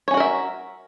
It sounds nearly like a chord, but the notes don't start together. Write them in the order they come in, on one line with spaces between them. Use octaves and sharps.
C#5 C#4 F#4 A#4 E5